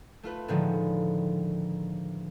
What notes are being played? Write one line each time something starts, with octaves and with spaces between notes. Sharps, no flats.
A3 F4 B4
A2 D3 D#3 F3 G#3